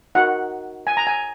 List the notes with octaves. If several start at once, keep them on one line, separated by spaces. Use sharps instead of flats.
D#4 F#4 A#4 F#5
G#5
A#5
G#5